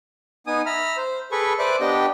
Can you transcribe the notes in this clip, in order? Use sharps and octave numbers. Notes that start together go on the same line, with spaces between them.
B3 D#4 G#5 D#6
E5 A#5 B5 F6
C5
G#4 A4 B4 B5 C#6
B4 C5 D5 E5 B5 F#6
B3 D4 G4 D#5 G5